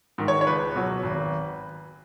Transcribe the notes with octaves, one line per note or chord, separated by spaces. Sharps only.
G#2 D#3
C#5
C#5
C#2 B4
B2 F#3
G#1